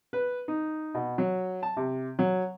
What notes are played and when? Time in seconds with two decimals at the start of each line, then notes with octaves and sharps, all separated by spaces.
0.13 B4
0.48 D#4
0.95 B2
1.18 F#3
1.63 A5
1.77 C3
2.19 F#3